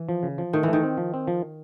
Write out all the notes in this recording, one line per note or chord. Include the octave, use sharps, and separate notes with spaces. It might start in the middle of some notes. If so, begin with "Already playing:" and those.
Already playing: E3
F3
C#3
F3
D#3 A3
E3
D#3 A3
C4
F3
C4
F3